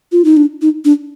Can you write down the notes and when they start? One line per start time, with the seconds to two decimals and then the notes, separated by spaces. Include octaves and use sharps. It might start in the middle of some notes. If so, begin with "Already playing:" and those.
0.12 F4
0.25 D#4
0.37 D4
0.62 D#4
0.85 D4